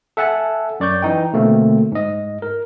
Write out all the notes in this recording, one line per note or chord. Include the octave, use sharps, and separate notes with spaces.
A4 E5 F#5 G#5 A5
F#2 D5 C#6 G6
E3 D#4 G5
B2 D3 A3 A#3 C4
G#2 D#5
A#4